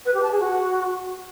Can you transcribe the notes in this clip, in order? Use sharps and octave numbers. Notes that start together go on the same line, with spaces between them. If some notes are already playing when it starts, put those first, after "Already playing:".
B4
G4
A5
G#4
F#4